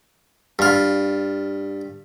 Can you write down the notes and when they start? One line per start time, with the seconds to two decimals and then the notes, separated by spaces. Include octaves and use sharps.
0.59 G2 F4